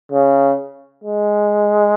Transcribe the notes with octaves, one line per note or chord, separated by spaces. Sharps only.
C#3
G#3